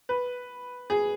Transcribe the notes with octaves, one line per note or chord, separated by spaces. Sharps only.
B4
G#4